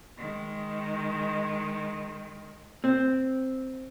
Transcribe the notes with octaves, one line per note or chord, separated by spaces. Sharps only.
D#3 G#3
C4